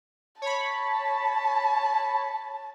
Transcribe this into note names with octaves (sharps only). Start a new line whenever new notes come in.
C#5 A5 B5